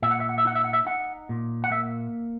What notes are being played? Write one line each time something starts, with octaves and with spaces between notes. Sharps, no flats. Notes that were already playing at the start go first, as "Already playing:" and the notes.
A#2 E5
F#5
E5
F#5
E5
D#4 F#5
E5
F#5
E5
D#4 F#5
A#2
F#5
A#3 E5